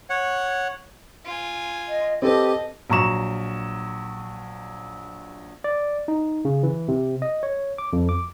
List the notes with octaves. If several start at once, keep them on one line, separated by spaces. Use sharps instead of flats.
C#5 F#5
F4 G#5
D#5
C4 G4 A4 B4 D#5 A5
A#1 F#3 A#5 C#6 E7
D5
D#4
C#3
E3
C3
D#5
C#5
D6
F2
D6